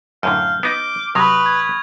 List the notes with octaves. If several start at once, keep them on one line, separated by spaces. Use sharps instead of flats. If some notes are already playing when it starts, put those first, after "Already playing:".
F#2 A2 D3 F5 F6 G6
B3 D#4 D6
C3 F#3 B4 B5 C#6 D#6 A#6 F7
G#6